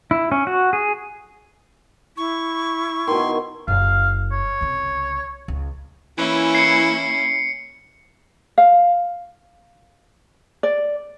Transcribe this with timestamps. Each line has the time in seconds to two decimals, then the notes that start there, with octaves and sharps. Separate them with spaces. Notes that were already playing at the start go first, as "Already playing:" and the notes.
0.11 E4
0.32 C#4
0.47 F#4
0.73 G#4
2.17 E4 C#6
3.07 B2 D#3 C6
3.68 F#1 F5
4.32 C#5
4.61 C2 C#3
5.48 C#2
6.18 E3 A#3 C#4 E4
6.55 C7 C#7
8.58 F5
10.63 D5